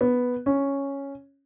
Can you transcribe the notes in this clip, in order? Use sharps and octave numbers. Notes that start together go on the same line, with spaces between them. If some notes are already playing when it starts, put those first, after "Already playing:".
B3
C#4